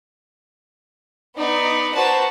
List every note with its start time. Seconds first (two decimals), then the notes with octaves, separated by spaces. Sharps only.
1.37 B3 D#4 D5
1.95 F#4 B4 C5 A5 A#5